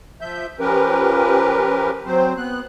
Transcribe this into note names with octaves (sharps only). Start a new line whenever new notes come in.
F3 E5 G6
F3 C#4 G4 A#4 B4
F#3 C4 C5
B3 F#6